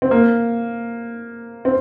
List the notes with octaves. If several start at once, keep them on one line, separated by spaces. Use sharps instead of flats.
C4
A#3
C4